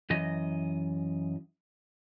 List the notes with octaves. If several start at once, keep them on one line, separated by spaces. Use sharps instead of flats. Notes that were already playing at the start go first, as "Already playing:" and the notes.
F#2 E3 D#5